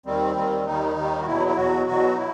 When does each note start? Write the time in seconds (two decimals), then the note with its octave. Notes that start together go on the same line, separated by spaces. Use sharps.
0.06 D#2 D#3 G3 C4
0.36 D#2 D#3 G3
0.66 D#2 D#3 G3 D#4
0.96 D#2 D#3 G3
1.21 F#4
1.26 E2 B2 F#3 E4
1.48 E4
1.56 E2 B2 F#3 F#4
1.87 E2 B2 F#3 F#4
2.13 D#4
2.17 E4